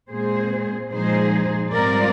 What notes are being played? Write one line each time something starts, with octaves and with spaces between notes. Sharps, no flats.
A#2 G#3 C4 G#4 C5
A#2 F3 G#3 D#4 G#4 C5
G#2 G3 C4 F4 A#4 D5